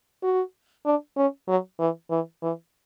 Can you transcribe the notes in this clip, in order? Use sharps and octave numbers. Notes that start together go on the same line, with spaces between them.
F#4
D4
C#4
F#3
E3
E3
E3